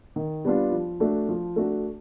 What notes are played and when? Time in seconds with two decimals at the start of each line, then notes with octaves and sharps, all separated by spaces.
0.16 D#3
0.45 G3 B3 D4 F4
0.72 F3
1.00 A3 D4 F#4
1.29 F3
1.56 A3 D4 F#4